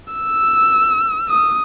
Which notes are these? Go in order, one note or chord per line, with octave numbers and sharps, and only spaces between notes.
E6
D#6